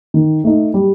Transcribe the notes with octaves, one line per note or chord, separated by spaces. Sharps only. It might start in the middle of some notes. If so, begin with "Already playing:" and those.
D#3
A3 D#4
G3